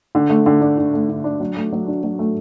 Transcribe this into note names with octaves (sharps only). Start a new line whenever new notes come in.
D3
A3
D3
D4
D3
A3
D3
D4
F#3
A3
F#3
D4
F#3
A3